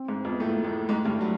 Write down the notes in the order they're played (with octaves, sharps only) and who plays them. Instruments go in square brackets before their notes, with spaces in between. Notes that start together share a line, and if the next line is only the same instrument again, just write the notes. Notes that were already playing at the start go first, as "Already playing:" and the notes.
Already playing: [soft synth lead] C4
[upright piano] G#2 G#3
F2 F3
[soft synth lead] B3
[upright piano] A2 A3 [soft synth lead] A#3
[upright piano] A2 A3 [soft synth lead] G#3
[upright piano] G#2 G#3 [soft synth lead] A3
[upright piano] G2 G3
F#3